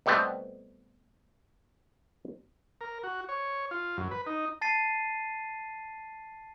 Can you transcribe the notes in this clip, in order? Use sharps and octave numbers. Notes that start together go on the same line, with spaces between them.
B2 G3 A3 B3 C4
A#4
F#4
C#5
F4
F#2
B4
D#4
A5 A6 C7 D#7